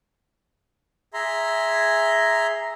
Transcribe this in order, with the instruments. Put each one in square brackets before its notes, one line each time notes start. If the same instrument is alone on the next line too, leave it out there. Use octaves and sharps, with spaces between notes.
[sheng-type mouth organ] G#4 E5 A#5 C6